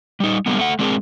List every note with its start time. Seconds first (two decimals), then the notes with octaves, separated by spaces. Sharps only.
0.20 G3 D#4
0.46 D3 G3 G#3 A#3 B3
0.59 A3 F#5
0.79 G#3 C4 D4 G#4 A#4